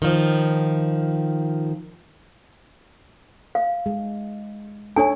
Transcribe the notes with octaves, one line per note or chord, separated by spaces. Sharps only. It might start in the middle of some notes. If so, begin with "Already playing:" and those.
D#3 F3
F5
G#3
D4 A4 C#5 G#5